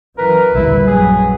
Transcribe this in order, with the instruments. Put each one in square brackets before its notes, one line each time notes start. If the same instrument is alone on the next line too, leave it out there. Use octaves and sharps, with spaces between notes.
[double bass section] F#2 E3 [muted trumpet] A#4 [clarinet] B4
[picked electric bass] A#1 G3 [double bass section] D#2 A#2 D3 [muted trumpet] E4
[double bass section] F#2 F#3 [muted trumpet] G#4